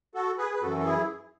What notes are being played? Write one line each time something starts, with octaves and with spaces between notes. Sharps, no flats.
F#4 A4
G#4 B4
B4
F#2 E3 F#4 A4
A4
E4 G#4